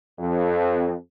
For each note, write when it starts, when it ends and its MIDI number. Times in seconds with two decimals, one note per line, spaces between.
0.19 0.93 41